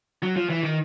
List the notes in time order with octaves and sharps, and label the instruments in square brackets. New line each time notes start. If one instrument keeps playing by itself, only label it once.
[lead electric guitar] F#3
F3
E3
D#3